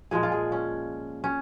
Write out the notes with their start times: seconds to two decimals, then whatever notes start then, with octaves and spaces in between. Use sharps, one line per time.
0.11 A#2 F3 G#3 G#4
0.23 F4
0.32 G#4
0.52 C#4
1.24 C#4